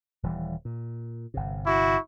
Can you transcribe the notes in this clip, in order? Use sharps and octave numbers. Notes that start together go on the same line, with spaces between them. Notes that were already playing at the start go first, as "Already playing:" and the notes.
D#1 E3 G3
A#2
G1 C3
E4 F#4 C#6